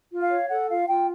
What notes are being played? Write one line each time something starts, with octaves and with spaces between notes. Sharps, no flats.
F4
F5
C#5
A4 F#5
F4 F5
F4 G5